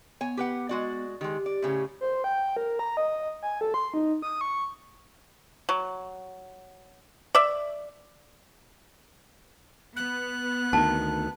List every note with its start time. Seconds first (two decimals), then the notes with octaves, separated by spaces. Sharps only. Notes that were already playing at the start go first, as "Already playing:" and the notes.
0.21 B3 C#5 G#5
0.37 G4 B4 F#5
0.69 G#3 F#4 D5
1.21 D#3 G#3 G4
1.46 D5
1.62 A2 C#3 C#4
2.01 C5
2.24 G5
2.57 A#4
2.79 A#5
2.97 D#5
3.43 G#5
3.61 A4
3.74 C6
3.94 D#4
4.22 D#6
4.41 C#6
5.69 F#3
7.35 D5 E5
9.96 B3 F#6
10.73 D2 D#3 A5